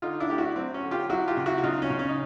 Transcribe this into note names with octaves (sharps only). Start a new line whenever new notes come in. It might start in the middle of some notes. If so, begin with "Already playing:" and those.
D3 D#4 F4
D4 E4
A3 G4
E4 F#4
F#3 C4
C#4
D3
F4 G4
F#3 E4 F#4
F4 G4
C#3
E4 F#4
F#4
C#3 D#4 F4
C#4
C#3
C#4
D#4